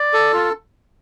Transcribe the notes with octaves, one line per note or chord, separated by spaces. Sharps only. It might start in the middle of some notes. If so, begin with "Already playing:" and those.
Already playing: D5
A4
F4